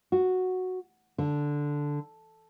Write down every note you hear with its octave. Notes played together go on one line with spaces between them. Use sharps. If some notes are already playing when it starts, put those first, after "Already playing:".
F#4
D3